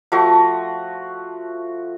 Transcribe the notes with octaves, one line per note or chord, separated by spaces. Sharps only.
F3 A3 F#4